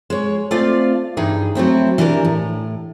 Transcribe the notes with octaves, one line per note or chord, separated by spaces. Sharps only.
G#3 C#5
A3 C4 F4 D5 F5
G2 E3 D#4 G#4 G5
F#3 A3 C4 E4
E3 D4 G4 G#4 A#4
A2